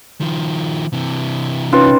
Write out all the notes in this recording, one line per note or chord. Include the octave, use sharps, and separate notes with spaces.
D#3 F3
C3 E3
C#4 D#4 F4 B4